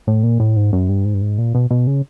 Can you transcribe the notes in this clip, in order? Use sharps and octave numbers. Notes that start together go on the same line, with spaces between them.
A2
A#2
A2
G#2
F#2
G2
G#2
G2
G#2
A#2
B2
B2
C#3